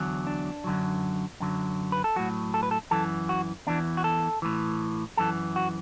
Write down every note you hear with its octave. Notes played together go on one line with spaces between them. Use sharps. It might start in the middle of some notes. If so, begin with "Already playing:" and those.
Already playing: E2 D3 F#3
D4
F#2 D3 F#3
F#2 D3 F#3
B4
A4
A2 F#3 F#4
A4
B4
A4
F#2 E3 A4
F#4
E2 E3 D4
F#4
A4
A2 E3
F#2 E3 A4
F#4